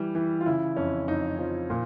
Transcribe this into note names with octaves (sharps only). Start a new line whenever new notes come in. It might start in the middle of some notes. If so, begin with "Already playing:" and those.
Already playing: E3 G3
E3
F4
C#3 E4
F2 C#4
F2 D#4
F3
A#2